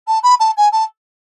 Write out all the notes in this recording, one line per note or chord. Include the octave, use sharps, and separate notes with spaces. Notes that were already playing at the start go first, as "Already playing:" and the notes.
A5
B5
A5
G#5
A5